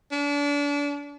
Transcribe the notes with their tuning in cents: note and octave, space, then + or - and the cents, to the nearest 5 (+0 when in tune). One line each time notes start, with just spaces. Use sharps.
D4 -35